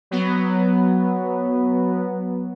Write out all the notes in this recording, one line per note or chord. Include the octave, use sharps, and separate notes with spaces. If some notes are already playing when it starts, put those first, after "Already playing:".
F#3 B3